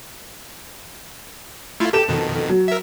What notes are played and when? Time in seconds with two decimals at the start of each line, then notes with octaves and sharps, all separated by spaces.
1.80 A3 E4 F4
1.93 G4 A4 E7
2.08 F2 B2 D#3
2.49 F#3
2.68 A#4 E5